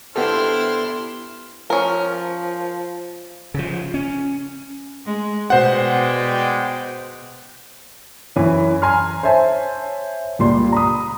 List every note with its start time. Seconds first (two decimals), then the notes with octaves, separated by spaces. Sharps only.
0.16 B3 D4 E4 G4 A4 C5 C6 F6
1.70 F3 C#4 A#4
3.54 C#3 F3
3.94 C#4
5.05 G#3
5.50 B2 G#3 C5 D5 F#5 G5
8.36 F#2 E3 C#4
8.82 G#5 A#5 C6 F6
9.23 C5 C#5 E5 G#5 A5
10.39 C#2 A#2 G3 C6
10.72 A#5 B5 D#6